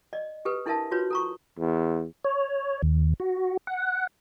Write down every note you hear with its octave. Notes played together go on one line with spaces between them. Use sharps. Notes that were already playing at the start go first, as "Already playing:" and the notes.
D5 D#5
G4 A4 B4
D4 E4 A4 A#4 E5 A5
F4 F#4 B4 C#5
A4 A#5 C#6
E2
C#5
D#2
F#4
F#5